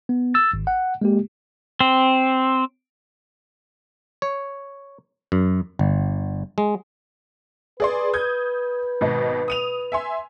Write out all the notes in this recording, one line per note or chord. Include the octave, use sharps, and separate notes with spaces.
B3
E6 A6
G#1
F#5
G#3 A#3 G4
C4
C#5
F#2
G1
G#3
G#4 B4 D5 C6
D#6 G6 G#6
G#1 B2 D#5
D#6 D#7 F7
E5 G#5 C6